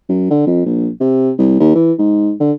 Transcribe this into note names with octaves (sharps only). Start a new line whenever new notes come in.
F#2
D3
F2
A#1
C3
C2
D#2
E3
G#2
D3